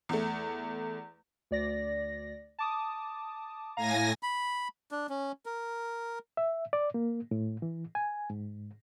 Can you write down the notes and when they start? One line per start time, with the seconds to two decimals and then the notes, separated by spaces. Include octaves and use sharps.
0.09 E2 A3
1.51 D2 D5 A#6
2.59 A5 D6 D#6
3.77 A2 F5 G#5 A#5 A#6
4.23 B5
4.91 D4
5.10 C#4
5.46 A#4
6.37 E5
6.73 D5
6.94 A#3
7.31 A2
7.62 E3
7.95 G#5
8.30 G#2